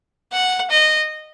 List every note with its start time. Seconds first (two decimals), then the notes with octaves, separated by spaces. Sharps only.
0.32 F#5
0.71 D#5